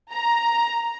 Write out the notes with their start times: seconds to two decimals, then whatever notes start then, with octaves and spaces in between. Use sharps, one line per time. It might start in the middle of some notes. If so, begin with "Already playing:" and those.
0.12 A#5